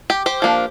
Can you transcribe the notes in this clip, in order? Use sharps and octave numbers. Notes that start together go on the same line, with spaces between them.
G4
G4 C5
F3 A#3 D4